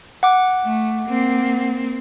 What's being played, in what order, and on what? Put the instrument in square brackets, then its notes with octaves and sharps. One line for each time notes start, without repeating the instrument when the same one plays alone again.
[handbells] F#5 D6
[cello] A3
A#3 C4